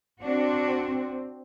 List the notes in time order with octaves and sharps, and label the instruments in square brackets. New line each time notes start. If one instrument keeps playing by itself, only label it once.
[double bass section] C4 [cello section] D4 F#4